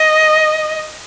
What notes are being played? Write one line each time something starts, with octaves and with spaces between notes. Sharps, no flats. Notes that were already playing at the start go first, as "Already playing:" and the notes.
Already playing: D#5